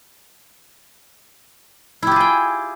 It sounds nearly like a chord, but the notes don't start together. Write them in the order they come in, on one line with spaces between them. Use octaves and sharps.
E4 G4 F4 G#4 G5